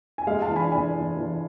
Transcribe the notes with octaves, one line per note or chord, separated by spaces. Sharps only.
G#5
G#3 F5
F5 A5
E3
G#5 B5
E3 G#5 B5
E3
E3